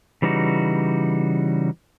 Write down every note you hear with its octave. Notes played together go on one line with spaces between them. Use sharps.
C#3 E3 G3 D#4 F#4